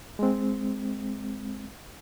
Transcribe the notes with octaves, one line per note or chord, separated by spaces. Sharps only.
G#3 C4